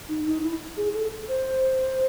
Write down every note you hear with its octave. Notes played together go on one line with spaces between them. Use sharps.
D#4
D#4
E4
G#4
A4
C5